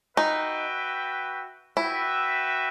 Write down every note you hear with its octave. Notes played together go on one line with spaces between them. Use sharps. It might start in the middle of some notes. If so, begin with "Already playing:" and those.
D#4 F#4 B4 E5 G5
E4 F#4 B4 E5 G5